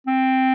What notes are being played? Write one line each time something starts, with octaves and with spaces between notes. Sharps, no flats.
C4